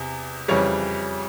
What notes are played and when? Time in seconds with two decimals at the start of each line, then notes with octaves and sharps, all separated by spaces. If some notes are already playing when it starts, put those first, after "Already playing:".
Already playing: E2 C3
0.48 F2 C#3 E3 G3 C#5